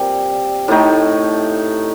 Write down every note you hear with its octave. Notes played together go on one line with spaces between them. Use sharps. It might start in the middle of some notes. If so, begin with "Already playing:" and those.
Already playing: A#2 G3 C4
A2 A3 D#4